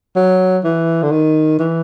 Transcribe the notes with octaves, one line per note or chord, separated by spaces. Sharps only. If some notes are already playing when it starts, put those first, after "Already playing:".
F#3
E3
D3
D#3
E3